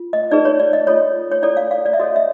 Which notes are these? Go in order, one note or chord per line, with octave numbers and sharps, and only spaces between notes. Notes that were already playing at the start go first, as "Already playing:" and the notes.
Already playing: F4
D#5
D#4 G#4 B4 D5
C#5
D5
D#5
F4 A4 C#5
C#5
E4 A4 C#5 D5
F5
F5
D5
E5
F#4 A4 C#5 D#5
E5